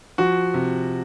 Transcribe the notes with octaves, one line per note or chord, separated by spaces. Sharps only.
F3 F#4
C3